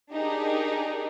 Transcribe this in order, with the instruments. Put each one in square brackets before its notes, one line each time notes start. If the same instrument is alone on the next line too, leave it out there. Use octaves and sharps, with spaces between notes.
[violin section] D4 D#4 G4 G#4 A#4